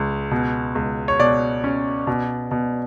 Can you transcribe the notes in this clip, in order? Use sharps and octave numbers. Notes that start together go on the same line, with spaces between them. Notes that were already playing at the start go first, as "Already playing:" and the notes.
Already playing: C#2
B2
C#2
C#5
B2 D5
C#4
B2
B2